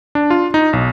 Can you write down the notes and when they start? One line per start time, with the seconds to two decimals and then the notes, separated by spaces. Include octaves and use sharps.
0.15 D4
0.30 F4
0.54 D#4
0.73 B1